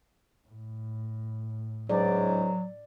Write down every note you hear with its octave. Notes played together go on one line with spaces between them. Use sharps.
A2
C#2 G#2 F#3 D5